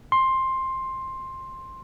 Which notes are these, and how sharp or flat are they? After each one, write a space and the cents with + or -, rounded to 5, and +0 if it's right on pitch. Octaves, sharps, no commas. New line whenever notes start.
C6 +10